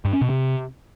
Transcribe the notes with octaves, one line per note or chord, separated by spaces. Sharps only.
G2
C#4
B2
C3